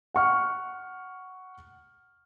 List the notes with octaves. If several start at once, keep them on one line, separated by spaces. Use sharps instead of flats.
F#5 C#6 F6